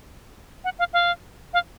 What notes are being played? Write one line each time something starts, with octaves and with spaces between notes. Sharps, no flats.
F#5
F5
F5
F5